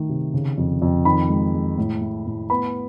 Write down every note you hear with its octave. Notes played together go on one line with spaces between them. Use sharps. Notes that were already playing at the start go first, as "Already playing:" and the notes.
Already playing: D#3 A3
C3
C#3
F2
F2
D#3 B5
G#3
G#3
A2
A3
A2
B3 B5